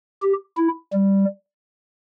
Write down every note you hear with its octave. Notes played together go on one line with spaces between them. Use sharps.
G4
E4
G3